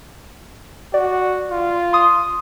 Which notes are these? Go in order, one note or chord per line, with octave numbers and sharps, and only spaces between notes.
F#4 D5
F4
C6 D#6